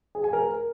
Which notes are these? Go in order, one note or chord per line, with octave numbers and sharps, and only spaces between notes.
G#4
G#5
A#4